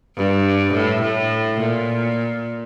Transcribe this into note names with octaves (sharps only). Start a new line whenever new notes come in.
G2
A2
A2
A#2